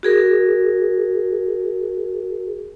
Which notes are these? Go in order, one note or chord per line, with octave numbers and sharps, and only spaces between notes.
F#4 G#4 A#4